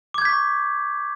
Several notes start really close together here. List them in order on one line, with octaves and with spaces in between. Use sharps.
D6 G#6 G6 B6 C#6